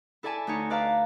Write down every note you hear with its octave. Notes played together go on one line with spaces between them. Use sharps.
E4 A4 D5 E5 G#5 A5
D2 D#4 C#5
B4 D5 F5 A5 A#5